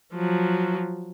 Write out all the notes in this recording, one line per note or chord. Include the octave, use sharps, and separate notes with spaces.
F3 F#3